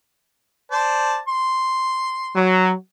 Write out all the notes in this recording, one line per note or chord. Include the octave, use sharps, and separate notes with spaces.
C5 D5 A5
C6
F#3